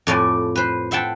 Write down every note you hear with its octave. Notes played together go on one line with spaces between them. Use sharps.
F2 A2 D5 G#5
B4 C5
C5 E5 F#5 G5 A5